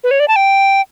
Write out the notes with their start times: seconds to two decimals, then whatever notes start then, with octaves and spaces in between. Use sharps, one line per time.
0.04 B4
0.11 C#5
0.20 D5
0.28 A5
0.36 G5